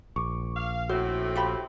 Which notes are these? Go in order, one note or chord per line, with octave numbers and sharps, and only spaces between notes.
A#1 C#6 D6
F5
A2 C4 F#4 C5
F4 G4 B5